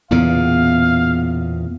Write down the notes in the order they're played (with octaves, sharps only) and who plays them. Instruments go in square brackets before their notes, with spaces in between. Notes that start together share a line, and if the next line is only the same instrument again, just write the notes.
[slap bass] E2 A#2 C#3 [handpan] B3 [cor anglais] F5